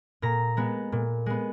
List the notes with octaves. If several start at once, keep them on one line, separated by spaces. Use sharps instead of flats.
A#2 A#5
G#3 B3
A#2
G#3 B3